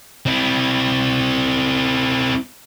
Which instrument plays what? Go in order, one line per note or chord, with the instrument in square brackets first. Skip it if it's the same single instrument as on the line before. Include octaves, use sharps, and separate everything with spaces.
[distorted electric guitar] C4 E4